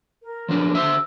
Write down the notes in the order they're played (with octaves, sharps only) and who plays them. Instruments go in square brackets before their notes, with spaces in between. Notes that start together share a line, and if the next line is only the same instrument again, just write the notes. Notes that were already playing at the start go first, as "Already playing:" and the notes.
[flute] A#4
[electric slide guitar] F3 F#3 D4
[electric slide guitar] D3 C5 E5 [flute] E6